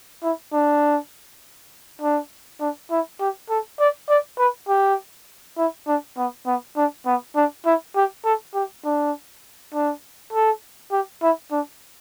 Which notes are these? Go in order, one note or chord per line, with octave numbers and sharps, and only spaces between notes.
E4
D4
D4
D4
E4
G4
A4
D5
D5
B4
G4
E4
D4
B3
B3
D4
B3
D4
E4
G4
A4
G4
D4
D4
A4
G4
E4
D4